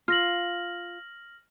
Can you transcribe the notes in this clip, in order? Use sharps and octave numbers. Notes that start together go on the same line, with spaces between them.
F4 F6 A#6 F#7